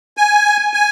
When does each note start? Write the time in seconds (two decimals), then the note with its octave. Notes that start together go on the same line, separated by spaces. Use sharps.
0.17 G#5
0.74 G#5